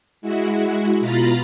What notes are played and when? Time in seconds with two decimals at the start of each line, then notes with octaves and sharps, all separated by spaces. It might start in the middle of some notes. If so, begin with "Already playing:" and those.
0.22 G#3 E4 F#4
1.00 B2 F4 A#5 B5 A6